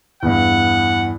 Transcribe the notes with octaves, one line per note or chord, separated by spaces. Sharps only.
E2 G2 F#5